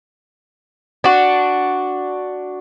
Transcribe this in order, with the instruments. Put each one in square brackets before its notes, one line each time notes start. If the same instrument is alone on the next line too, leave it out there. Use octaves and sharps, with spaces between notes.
[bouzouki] D4 F#4